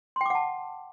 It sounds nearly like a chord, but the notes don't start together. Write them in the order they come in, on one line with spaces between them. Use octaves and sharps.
C6 G5 D6 F#5 A5